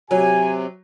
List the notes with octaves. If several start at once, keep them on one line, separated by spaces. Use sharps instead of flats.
C3 F#3 G#5